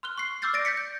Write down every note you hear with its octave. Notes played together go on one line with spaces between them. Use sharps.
C6 F6 F#6 G7
C#6 C7
D6 E6 F6 G6 A6 C7
D5 A6 A#6 D7
G6 A6 B6 C#7
G6